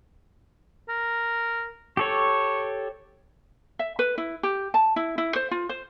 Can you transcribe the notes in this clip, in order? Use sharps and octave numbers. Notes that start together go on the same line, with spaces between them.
A#4
G4 A4 C#5 C#6
E5
B4
E4
G4
A5
E4
E4
C5
F4
C5